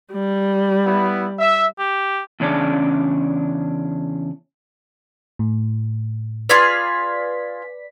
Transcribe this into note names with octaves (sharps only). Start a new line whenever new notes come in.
G3
B3 E4
E5
G4
E2 C#3 C#4 D4 D5
A2
F4 G#4 B4 D5 F5 B6